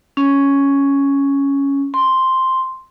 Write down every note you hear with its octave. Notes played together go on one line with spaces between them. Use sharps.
C#4
C6